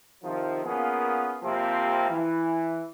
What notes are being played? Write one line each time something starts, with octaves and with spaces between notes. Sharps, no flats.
C3 D#3 F3
A#3 B3 C#4 F4 G#4
C3 F3 G3 A#3 C4
E3